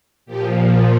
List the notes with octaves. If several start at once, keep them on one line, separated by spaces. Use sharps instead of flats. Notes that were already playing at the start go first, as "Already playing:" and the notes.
A#2 F3 G4